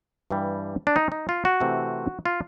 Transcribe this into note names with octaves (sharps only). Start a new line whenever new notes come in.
G2 E3 G3
D4
D#4
D#4
F4
F#4
C3 E3 A3 C4
F4